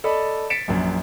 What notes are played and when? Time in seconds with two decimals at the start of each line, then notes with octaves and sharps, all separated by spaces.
0.04 A4 D5 D#5 A5 B5
0.50 A6 B6 C#7 D7 E7
0.68 A#1 F#2